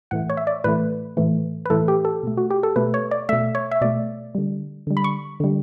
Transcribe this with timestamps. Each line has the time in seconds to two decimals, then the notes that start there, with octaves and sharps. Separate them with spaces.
0.11 A2 E3 A3 F#5
0.30 C#5
0.37 E5
0.47 D5
0.64 A2 E3 A3 B4
1.17 A2 E3 A3
1.65 B4
1.70 A2 E3 A3 A4
1.88 G4
2.05 A4
2.23 B2 A3
2.37 F#4
2.51 G4
2.63 A4
2.76 B2 A3 B4
2.94 C#5
3.11 D5
3.29 B2 A3 E5
3.55 C#5
3.71 E5
3.81 B2 A3 D5
4.35 D3 G3
4.87 D3 G3
4.97 B5
5.04 C#6
5.40 D3 G3